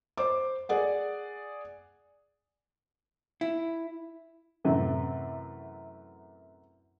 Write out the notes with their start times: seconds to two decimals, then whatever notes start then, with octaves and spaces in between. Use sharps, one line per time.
0.18 C5 D6
0.69 G#4 D5 F#5
3.41 E4
4.64 F#2 A2 C3 E3